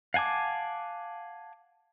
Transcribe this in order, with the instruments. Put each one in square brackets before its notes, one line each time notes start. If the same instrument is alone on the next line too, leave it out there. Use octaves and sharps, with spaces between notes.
[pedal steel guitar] F5 F#5 G#5 A5 D6